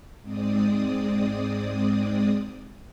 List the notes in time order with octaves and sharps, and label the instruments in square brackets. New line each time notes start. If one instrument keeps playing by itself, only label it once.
[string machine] G#2 G#3 C4 D5 D#6